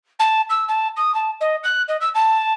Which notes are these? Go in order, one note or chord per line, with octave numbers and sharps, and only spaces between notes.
A5
E6
A5
D#6
A5
D#5
F#6
D#5
E6
A5